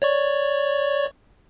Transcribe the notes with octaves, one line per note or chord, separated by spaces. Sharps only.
C#5 D5 C#6